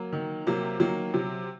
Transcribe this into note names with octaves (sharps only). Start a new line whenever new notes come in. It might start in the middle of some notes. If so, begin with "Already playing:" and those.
Already playing: F#3 A#3
D#3
C3 F#3 A#3
D#3 F#3 A#3
C3 F#3